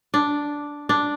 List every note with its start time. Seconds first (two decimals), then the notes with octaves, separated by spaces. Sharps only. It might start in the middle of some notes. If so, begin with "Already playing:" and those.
0.14 D4
0.89 D4